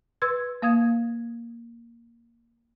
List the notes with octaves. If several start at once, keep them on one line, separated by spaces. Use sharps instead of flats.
B4 C6 E6 G#6
A#3 F5 D#6 G#6